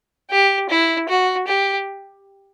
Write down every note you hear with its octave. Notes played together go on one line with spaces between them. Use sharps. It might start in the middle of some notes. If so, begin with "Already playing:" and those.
G4
E4
F#4
G4